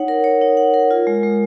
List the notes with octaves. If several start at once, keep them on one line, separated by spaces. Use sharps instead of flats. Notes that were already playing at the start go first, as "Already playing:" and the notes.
Already playing: D#4 C#5 F#5
A#4
C#5
D#4
F#5
A#4
F4
G#3
G#3